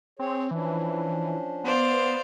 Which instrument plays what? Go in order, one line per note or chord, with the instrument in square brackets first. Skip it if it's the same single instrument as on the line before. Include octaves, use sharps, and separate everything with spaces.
[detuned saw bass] C4 [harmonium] G#4 C#5
[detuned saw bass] E3 [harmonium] F3 C#4 D4
[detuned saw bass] B3 [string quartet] C5 D5 F5